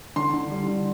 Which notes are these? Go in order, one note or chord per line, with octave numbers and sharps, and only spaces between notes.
D3 C6
D3
G3
D3